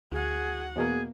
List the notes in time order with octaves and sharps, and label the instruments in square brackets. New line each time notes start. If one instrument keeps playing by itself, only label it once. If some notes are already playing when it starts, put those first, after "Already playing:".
[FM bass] D2 [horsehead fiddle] F#4 F#5 [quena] G#4
[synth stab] E2 B2 A#3 [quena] G#4